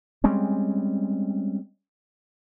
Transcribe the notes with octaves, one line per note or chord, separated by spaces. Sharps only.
G3 G#3 C4 C#4